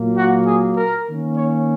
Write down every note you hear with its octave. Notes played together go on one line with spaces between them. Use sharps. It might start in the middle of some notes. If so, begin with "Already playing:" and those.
Already playing: A#2 F#3 A#3
F#4
G#4
A#4
D#3 A#3 C#4
C#5